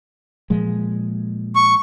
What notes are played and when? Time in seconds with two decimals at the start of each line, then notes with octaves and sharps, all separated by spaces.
0.50 A#2 F3 G#3
1.56 C#6